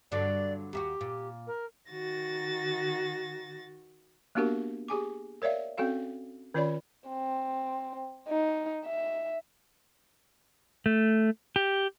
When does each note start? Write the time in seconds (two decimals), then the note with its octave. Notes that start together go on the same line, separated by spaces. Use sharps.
0.12 G2 D3 F#3 D5
0.73 D#2 E4 F#4 G4
1.01 A#2
1.47 A#4
1.90 D#3 F#4 A6 A#6
4.35 A#3 B3 D4 F#4 G4 A#4
4.88 G4 G#4 G#5 D6
5.42 A#4 C#5 D5 E5 F5
5.78 C4 C#4 F#4 A4 F5
6.54 D#3 C#4 F4 C#5 D5 B5
7.09 C4
8.28 D#4
8.86 E5
10.86 A3
11.56 G4